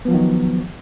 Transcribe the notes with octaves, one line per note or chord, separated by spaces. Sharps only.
D#3 F3 F#3 B3